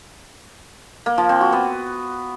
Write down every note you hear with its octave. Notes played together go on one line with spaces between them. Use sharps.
A#3
F3
C4
F#4
B3